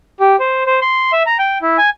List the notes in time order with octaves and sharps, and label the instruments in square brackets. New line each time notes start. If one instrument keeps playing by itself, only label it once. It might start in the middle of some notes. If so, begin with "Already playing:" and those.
[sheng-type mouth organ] G4
C5
C5
C6
E5
A#5
G5
E4
G#5